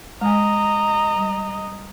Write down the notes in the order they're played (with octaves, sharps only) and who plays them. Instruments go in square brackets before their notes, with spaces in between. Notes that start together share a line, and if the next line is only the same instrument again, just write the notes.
[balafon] G#3 G#5 [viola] D#5 A#5
[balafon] G3